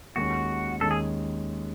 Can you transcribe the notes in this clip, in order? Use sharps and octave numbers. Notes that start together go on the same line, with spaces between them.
D#2 D#3 G#3 C#4 F#4
D#2 D#3 G#3 C#4 A4
G#4